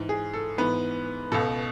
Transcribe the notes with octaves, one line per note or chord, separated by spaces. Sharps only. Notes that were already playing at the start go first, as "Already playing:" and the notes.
Already playing: G#2 E3
G#4
A4
G#2 E3 B3 B4
C#2 B2 A4